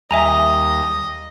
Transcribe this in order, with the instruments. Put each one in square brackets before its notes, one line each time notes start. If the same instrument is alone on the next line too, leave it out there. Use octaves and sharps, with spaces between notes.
[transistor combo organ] D#2 G3 [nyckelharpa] D#5 [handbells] E5 G#5 A#5